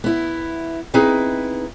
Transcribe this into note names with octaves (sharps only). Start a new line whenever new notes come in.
B3 E4
B3 C4 D#4 E4 G#4 B4